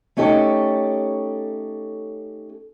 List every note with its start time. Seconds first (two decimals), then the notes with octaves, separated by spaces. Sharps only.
0.17 A3 C#4 D#4 G4 A4 C#5